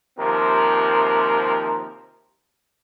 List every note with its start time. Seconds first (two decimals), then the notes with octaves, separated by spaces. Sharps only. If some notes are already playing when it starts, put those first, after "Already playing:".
0.19 D#2 C3 F3 C4 A#4